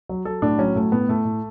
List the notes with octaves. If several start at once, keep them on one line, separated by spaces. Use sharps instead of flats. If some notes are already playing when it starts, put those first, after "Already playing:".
F#3
F#3 A4
A2 D4
F#3 C#4
A2 A3
A2 B3
A2 A3
A2